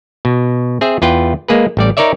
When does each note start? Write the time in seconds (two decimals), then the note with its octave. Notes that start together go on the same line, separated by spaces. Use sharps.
0.25 B2
0.81 C4 G#4 E5
1.02 E2 F4 B4 G5
1.48 G#3 A#3 G#4 B4
1.77 A1 G3 D5
1.97 D#4 A#4 C#5 D5 E5